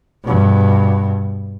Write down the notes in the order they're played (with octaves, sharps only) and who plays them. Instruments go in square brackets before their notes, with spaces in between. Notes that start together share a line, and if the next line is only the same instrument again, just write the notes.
[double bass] G2 B2